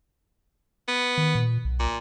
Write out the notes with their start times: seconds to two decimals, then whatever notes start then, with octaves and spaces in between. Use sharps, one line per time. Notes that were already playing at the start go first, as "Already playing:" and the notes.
0.88 B3
1.18 D#3
1.35 A#2
1.65 B1
1.80 A#2